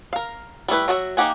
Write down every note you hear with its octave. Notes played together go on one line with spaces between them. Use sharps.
A#4 F5
G3 A3 E4 B4
F#3 F#4 A4 E5
A#3 D#4 G4 F#5 G#5